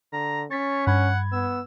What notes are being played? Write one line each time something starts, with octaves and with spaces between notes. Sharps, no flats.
D3 A#5
C#4 C#5 A6 B6
G2 F#5 B5 G#6
B3 E6